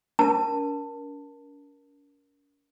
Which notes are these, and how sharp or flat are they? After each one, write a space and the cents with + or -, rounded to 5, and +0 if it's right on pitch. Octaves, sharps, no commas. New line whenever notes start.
C#4 +45 A#4 +20 A5 +15